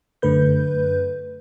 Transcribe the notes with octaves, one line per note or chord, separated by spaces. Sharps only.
F#2 D3 A3 B4 G6